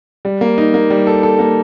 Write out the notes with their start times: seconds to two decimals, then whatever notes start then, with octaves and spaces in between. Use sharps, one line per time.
0.25 G3
0.41 A#3
0.58 D#4
0.74 A#3
0.90 G3
1.07 A4
1.23 A4
1.39 A#3